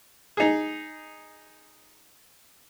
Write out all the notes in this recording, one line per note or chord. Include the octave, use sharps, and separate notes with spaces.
D#4 G#4